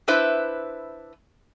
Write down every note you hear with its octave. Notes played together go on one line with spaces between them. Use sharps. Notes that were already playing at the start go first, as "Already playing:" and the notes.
D4 E4 B4 C5 E5